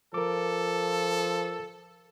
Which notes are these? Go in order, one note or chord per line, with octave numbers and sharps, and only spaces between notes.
F3 A4 A#4 D6